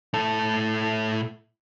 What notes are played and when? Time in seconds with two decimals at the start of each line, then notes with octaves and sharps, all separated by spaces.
0.13 A2 A4